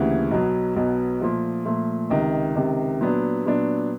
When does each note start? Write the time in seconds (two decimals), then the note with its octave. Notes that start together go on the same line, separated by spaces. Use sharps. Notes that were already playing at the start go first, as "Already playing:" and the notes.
Already playing: D2 C#3 E3 G3 A#3
0.31 B1 B2 F#3 B3
0.76 B1 B2 F#3 B3
1.20 A#2 F3 A3
1.65 A#2 F3 A3
2.10 C#2 C3 D#3
2.55 C#2 C3 D#3
3.01 A#2 F#3 B3 D4
3.46 A#2 F#3 B3 D4